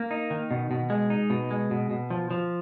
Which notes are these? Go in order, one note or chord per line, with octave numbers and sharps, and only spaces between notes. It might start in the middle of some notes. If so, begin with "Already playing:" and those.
Already playing: A#3
D#4
D#3
B2
B2
G#3
D#4
B2
G#3
B2
B2
F3
F3